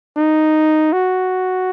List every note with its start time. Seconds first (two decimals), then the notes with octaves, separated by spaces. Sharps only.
0.17 D#4
0.93 F#4